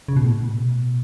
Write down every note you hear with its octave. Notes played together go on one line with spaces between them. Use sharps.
C#3
B2
A2
B2
A2
B2